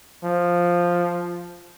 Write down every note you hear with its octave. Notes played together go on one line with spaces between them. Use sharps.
F3